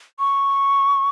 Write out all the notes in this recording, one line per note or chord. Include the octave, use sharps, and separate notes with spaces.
C#6